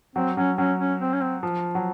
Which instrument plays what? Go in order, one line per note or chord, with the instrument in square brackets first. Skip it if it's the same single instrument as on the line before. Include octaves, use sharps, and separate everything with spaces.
[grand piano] F#3 [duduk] C4
[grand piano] F#3 [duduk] C#4
[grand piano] F#3 [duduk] C#4
[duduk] C#4
C4
C#4
C4
[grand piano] F3
F#3